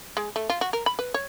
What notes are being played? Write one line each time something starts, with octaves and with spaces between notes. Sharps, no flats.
G#3
A3
F4
F#4
A#4
B5
B4
C#5